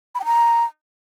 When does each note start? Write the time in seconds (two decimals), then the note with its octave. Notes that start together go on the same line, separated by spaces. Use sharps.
0.15 B5
0.20 G5
0.25 A#5